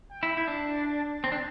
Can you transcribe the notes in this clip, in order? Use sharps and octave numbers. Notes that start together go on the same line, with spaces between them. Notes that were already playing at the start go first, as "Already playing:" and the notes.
G5
E4
E4
D4 A5
C4
D4